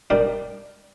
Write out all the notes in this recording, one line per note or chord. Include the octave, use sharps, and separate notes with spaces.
G3 D4 G4 A#4